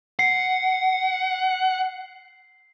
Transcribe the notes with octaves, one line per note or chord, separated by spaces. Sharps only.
F#5 C7